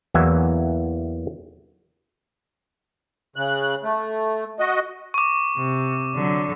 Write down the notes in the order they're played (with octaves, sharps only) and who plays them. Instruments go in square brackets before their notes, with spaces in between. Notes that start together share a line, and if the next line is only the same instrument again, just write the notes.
[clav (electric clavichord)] E2 E3 F#3 A#3 E5 G#5
[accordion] C#3 F#6
A3
F#4 D#5
[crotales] C#6 D6
[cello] C3
D3 F#3